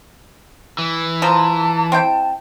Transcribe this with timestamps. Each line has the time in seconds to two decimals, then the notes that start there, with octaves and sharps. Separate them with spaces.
0.78 E3
1.22 F3 C5 A5 A#5
1.92 C4 E4 G5